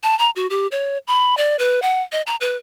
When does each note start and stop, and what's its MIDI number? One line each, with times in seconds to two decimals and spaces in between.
0.03 0.17 81
0.19 0.30 82
0.36 0.47 66
0.50 0.67 67
0.72 0.98 73
1.08 1.37 83
1.37 1.56 74
1.59 1.80 71
1.82 2.02 78
2.12 2.22 75
2.27 2.36 82
2.41 2.57 71